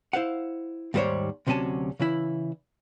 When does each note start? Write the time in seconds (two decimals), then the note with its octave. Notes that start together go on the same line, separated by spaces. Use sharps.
0.13 E4 C5 F5 F#5
0.94 D#2 G#2 G3 E4 C5 C#5
1.47 D2 C3 F#3 C#4 G#5 A5
2.00 C#3 E3 E4